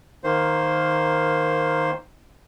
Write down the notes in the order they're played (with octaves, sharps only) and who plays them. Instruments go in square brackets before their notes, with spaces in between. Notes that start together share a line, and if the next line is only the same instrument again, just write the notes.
[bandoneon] D#3 A#3 C5